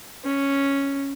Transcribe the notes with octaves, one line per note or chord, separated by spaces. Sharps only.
C#4